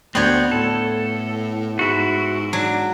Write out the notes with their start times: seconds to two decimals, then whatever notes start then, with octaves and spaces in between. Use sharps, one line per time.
0.15 D2 B3 C4 C#5 D5 G6
0.51 A2 A4
1.79 G#2 E4 F#4
2.53 F#3 D4